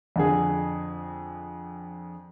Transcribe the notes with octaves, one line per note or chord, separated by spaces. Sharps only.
F2 D3 G#4